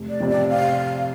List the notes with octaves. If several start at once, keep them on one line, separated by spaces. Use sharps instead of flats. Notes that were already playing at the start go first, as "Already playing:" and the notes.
Already playing: F1
D5
F2 C3
D5
F5